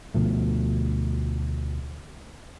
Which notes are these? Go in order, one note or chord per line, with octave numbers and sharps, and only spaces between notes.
D2 B2 F3 A3